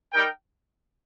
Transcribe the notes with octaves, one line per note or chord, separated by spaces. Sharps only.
G3 D#4 A#4 G5